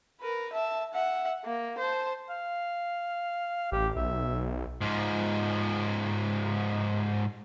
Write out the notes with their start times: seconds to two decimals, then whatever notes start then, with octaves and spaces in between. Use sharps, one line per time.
0.21 A#4 B4
0.52 E5 A5
0.93 E5 F#5
1.44 A#3
1.78 C5 A5
2.30 F5
3.72 A1 G4
3.96 B1 E5
4.81 G#2 F3